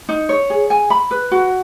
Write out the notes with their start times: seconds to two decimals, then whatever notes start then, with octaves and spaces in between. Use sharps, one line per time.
0.09 D#4
0.29 C#5
0.50 G#4
0.70 G#5
0.90 B5
1.11 B4
1.31 F#4